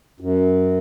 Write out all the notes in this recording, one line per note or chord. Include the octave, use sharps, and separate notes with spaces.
F#2